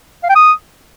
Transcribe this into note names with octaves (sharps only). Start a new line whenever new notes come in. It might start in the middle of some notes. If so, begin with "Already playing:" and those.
F5
G5
D#6